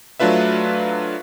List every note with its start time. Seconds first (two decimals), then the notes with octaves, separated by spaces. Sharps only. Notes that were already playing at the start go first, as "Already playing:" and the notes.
0.20 F#3 A3 D4 F4 B4 E5